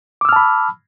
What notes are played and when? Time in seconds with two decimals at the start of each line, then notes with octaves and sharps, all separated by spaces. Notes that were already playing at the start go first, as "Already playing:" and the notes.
0.21 D6
0.25 E6
0.29 F6
0.32 A5
0.36 B5